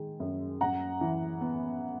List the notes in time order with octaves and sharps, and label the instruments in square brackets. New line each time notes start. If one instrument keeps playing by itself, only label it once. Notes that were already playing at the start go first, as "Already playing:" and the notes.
Already playing: [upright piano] D#3 G#3
F#2
F#2 F#5 A#5
E3
B3